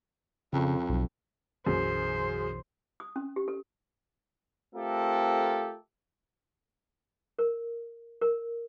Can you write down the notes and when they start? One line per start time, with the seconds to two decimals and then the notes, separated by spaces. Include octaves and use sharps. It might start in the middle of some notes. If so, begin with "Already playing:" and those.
0.53 F2 C#3
0.90 B1
1.66 B1 F#2 E3 F#3 G#4 C5
3.00 D#6
3.16 C#4
3.36 G4
3.48 A4
4.75 A3 C4 F4 G4 A4 A#4
7.39 A#4
8.21 A#4